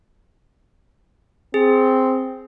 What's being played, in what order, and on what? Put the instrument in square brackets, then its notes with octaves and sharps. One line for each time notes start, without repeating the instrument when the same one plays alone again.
[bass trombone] C4 [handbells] G#4